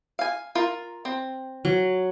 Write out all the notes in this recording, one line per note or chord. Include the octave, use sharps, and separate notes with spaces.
F5 G#5
F4 A#4
C4
F#3